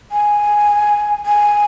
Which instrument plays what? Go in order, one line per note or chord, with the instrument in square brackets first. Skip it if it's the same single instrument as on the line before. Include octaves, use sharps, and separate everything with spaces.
[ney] G#5
G#5